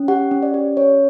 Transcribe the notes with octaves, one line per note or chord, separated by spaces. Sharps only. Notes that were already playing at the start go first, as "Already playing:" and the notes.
Already playing: C#4
G4 F#5
C#4
D5
G4
C#4 C#5